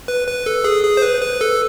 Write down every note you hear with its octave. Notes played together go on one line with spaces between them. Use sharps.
B4
B4
A4
G#4
G#4
C5
B4
B4
A4